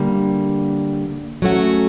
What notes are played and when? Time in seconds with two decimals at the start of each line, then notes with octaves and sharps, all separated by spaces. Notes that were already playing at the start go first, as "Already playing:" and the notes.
Already playing: D3 G3 A#3
1.42 F#3 A3 C#4 F#4